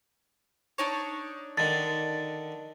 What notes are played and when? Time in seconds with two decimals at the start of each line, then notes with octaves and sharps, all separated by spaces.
0.78 D4 D#4 C#5
1.57 D3 D#3 A6